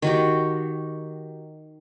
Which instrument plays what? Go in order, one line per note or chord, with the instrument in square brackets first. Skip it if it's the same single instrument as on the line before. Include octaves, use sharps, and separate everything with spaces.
[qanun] D#3 F#4 G4